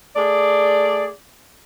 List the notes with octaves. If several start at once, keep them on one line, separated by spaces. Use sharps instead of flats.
A3 G#4 D5